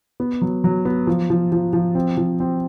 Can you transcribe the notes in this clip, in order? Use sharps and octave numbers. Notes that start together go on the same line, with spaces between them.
B3
F#3
F#3
B3
F3
F3
F3
F3
C4
F3
C4